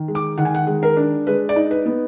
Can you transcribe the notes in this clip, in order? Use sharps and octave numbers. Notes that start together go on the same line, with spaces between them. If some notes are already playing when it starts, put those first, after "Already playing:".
Already playing: D#3
G#3
D6
D#3 F#5
G#5
F#5
G#3
A#4
D4
G#3 B4
D5
D#4
B4
B3